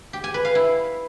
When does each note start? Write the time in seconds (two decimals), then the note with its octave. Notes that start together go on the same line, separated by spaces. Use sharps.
0.13 G4
0.24 G#5
0.34 B4
0.45 F5
0.55 E4